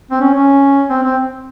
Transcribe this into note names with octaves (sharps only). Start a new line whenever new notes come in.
C4
C#4
C#4
C4
C4